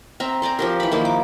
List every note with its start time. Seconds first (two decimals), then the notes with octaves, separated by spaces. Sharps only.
0.20 C4 E5 A#5
0.42 C5 D5 G#5 A#5
0.59 F3 G4 A#4
0.80 E3 B5
0.92 D#3 F3 A#3 E4
1.05 D6